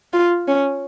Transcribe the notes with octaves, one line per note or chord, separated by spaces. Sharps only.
F4
C#4